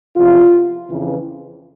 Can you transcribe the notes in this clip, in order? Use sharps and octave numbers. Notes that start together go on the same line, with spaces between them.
E2 C3 F3 F4
F2 C#3 E3